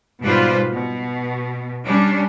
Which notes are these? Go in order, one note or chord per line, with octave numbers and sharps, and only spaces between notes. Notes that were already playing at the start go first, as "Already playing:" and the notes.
G#2 B2 G3 F4 B4 C5
B2
G3 C#4 D4